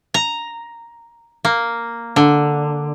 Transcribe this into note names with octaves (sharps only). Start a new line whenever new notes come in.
A#5
A#3
D3